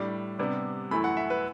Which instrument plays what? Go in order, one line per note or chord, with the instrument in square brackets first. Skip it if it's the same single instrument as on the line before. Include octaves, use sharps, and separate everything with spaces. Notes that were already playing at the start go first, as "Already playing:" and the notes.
Already playing: [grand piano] A2 G3 D4
C3 G3 B3 D4
F#2 E3 A3 E4 B5
F#5
E5
B4